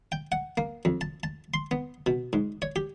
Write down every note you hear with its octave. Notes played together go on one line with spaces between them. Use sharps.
G5
F#5
A#3
F2
A5
A5
C6
B3
B2
G#2
C#5
G4